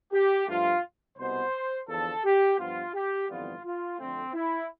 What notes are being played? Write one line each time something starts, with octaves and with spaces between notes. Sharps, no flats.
G4
G2 F3 A3 F4
C2 B2 B3 C5
E2 D3 F3 A4
G4
G2 F3 B3 F4
G4
G1 F2 E3 G3 B3 F4
F4
F2 D3 A3 C4
E4